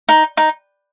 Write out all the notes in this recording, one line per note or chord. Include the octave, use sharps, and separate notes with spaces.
D#4
D#4